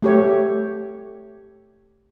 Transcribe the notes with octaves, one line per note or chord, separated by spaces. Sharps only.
A3 G4 C#5